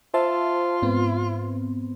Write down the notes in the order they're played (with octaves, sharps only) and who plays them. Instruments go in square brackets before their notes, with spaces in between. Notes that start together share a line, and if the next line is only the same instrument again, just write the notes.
[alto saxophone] F4 [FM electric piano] C5 E5 A5
[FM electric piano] G#2 B3 C4